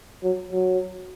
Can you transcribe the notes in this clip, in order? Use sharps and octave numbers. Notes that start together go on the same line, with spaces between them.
F#3
F#3